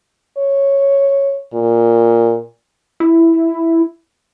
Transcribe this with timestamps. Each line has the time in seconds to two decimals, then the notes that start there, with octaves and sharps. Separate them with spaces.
0.38 C#5
1.53 A#2
3.00 E4